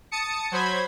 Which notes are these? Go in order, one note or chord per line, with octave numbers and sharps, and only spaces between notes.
A5 D#6 C#7
F#3 C5 B5 G#6